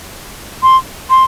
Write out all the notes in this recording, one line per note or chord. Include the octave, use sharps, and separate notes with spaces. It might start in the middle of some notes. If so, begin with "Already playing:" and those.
C6
C6